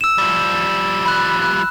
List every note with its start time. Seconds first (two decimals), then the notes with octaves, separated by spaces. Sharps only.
0.01 E6 E7
0.18 F3 G3
1.06 B5 F#6
1.42 F#6